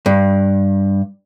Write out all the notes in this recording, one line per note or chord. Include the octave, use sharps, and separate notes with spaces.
G2